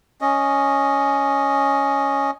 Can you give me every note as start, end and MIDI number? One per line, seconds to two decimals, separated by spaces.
0.21 2.31 61
0.21 2.31 75